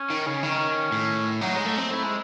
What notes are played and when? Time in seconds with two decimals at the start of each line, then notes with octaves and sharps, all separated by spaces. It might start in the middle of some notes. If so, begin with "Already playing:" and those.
Already playing: C#4
0.10 D#3
0.26 C#3
0.43 D#3 C#4
0.92 A2
1.41 F#3 D#4
1.54 G#3
1.66 A3
1.77 C4
1.91 A3 E4
2.03 G#3